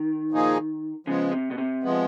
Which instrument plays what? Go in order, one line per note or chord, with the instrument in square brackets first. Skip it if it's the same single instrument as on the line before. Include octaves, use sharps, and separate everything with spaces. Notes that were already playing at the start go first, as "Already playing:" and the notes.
Already playing: [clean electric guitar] D#3
[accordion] A#2 F3 A#3 D#4 G#4
[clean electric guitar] C#3 [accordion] F3 G#3 B3
[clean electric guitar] C3
B2
C3
[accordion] F3 G#3 B3